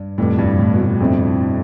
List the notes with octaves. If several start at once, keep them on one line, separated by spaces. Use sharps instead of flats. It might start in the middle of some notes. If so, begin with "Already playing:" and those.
Already playing: G2
F1 F2 A2 D3 G3 D4
G2
A2
B2
A2
F2 D3 F3 C4 E4